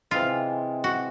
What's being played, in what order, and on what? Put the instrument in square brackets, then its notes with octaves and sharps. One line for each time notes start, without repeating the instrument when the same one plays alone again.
[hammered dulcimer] C3 E3 G#3 [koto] F4
[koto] F#4